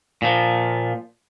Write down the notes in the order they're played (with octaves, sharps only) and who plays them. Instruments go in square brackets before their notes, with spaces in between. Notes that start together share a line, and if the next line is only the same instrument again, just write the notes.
[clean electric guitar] A#2 F3